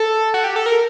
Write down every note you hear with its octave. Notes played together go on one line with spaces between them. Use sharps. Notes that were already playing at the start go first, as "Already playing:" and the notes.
Already playing: A4
F#4
G4
A4
A#4